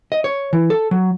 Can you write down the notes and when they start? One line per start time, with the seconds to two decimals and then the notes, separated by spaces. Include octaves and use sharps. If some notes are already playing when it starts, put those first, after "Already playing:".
0.12 D#5
0.24 C#5
0.53 E3
0.70 A4
0.91 F#3